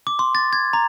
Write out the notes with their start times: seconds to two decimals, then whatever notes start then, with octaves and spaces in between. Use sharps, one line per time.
0.07 D6
0.19 C6
0.35 A6
0.53 G#6
0.73 A#5